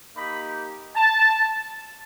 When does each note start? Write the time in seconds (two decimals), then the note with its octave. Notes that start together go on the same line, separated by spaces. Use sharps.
0.14 A#3 D#4 G4 B5
0.96 A5